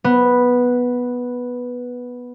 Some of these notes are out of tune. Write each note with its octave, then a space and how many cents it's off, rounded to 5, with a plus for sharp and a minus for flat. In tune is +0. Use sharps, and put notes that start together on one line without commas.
B3 -5